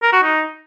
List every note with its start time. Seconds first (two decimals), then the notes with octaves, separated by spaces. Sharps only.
0.02 A#4
0.13 F#4
0.23 D#4